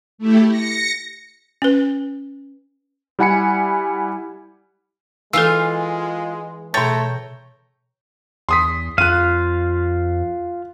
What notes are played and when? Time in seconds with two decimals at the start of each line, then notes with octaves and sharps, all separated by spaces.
0.18 A3 E4 G4
0.49 A#6 C#7
1.62 C#4 B4
3.19 G3 E4 F#5 G#5 B5 C#7
5.33 E3 G#3 F4 A4 F5 E6
6.74 B2 A3 C#5 G5 A#5 A6
8.49 E2 C6 D#6 B6
8.98 F2 F4 F5 F#6 D#7